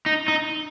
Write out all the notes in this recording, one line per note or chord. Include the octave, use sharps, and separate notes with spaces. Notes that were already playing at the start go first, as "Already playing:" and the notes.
D#4
D#4